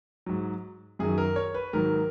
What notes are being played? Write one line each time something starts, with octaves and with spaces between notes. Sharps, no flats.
G#2 F#3
F#2 D#3 F#3 G#4
A#4
C#5
B4
G#2 D#3 F#3 A#4